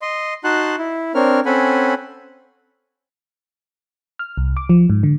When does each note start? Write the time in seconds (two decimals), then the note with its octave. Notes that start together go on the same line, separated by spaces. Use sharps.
0.02 D#5 C6
0.44 D#4 F#4 F#5 A5 C6 F#6
0.78 E4
1.15 C4 D4 A#4 C#5 F6
1.46 C4 C#4 A4 F#5 G#5 B5
4.19 F6
4.37 C2
4.57 D6
4.69 F3
4.90 G#2
5.03 D3